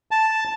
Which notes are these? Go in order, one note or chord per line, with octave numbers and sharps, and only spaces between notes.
A5